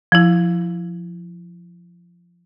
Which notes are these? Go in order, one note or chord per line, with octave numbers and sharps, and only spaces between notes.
F3 E4